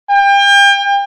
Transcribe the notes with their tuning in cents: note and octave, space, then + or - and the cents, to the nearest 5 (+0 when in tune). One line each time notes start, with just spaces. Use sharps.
G5 +35